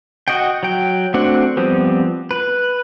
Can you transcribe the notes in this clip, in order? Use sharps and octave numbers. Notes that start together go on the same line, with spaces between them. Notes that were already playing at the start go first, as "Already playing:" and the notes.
F#4 D#5 F#5 G5
F#3 G5
A3 C4 D4 F#4 F#5
F3 G3 B3 C4
B4